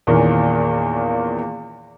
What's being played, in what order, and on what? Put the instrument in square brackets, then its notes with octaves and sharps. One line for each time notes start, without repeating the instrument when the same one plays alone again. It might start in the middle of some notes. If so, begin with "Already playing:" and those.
[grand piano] E2 A#2 D#3 E3 A#3 C#4